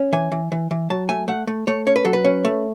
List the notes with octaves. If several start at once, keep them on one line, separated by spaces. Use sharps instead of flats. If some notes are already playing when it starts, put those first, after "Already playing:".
Already playing: C#4
E3 G#5
E3
E3
E3
F#3 A5
A3 G#5
A3 F#5
A3
A3 C#5
C#4 C#5
B4
F#3 A4
B4
C#4
A3